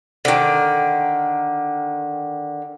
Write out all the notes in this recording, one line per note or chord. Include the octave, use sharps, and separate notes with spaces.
D3 D#3